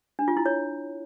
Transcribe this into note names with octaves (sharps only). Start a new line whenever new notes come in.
D4
F4
E4
C#5